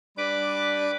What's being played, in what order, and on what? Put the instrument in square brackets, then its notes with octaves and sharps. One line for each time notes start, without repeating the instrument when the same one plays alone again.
[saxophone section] G3 D4 [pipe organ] B4 D6